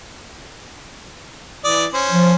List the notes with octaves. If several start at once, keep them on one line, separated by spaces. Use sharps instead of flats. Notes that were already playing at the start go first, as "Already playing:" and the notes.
E3 D5 D#6
C#4 C5
F3